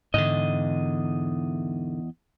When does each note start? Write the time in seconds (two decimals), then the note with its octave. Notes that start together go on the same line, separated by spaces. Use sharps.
0.14 E2 G#2 D3 D#5